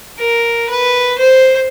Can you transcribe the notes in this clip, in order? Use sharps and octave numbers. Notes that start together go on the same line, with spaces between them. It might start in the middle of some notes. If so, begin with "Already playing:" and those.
A#4
B4
C5